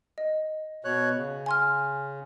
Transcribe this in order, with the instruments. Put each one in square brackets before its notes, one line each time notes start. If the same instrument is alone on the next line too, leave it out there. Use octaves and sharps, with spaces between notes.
[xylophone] D#5
[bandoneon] B2 C#5 F#6
C#3
[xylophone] G#5 C6 F6